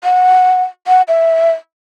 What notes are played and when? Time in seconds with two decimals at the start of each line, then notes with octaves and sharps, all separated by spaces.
0.04 F#5
0.87 F#5
1.08 E5